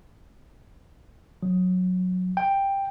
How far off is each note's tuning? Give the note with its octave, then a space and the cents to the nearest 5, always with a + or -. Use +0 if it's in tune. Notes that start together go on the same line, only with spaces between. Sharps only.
F#3 -15
G5 +5